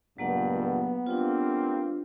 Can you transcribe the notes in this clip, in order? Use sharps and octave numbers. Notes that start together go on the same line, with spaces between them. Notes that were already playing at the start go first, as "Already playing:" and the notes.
C#2 G2 A#2 F#3 A#3 B3 F#5
G3 A#3 C4 D4 F4